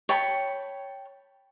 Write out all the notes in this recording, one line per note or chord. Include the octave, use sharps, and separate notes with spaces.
C#5 G5 A5 B5